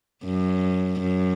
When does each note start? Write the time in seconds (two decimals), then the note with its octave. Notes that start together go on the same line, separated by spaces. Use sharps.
0.25 F#2
1.01 F#2